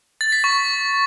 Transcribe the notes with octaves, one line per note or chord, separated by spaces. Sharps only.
A6
B6
C#6